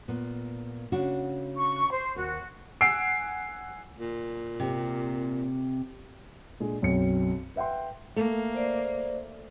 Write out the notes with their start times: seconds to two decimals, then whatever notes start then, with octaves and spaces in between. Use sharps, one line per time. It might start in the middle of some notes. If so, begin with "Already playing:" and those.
0.08 A#2 B3
0.92 C#3 D4 F#4
1.57 C#6
1.91 C5
2.16 D#2 F#4
2.81 F#5 G#5 E6 C7 D7
3.99 A#2
4.60 C3
6.60 A#2 G#3 D4 G#4
6.82 B1 F#2 C4 C#7
7.56 B4 E5 F#5 G5 C6
8.16 A3 A#3
8.54 C5 D5